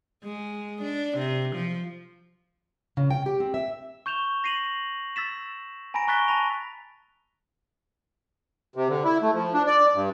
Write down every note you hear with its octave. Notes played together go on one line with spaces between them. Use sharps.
G#3
D4
C3
F3
C#3
G5
G4
C4
E5
C#6 G6 E7 F7 G7
A#6 C7 D#7 F7 F#7
E6 A6 B6 E7
G#5 A#5 B5 A#6 D7
A#5 C#6 F#6 A6 B6 G7
A5 B5 A#6 F7
C3
D3
E4
A3
F3
D4
D5
G2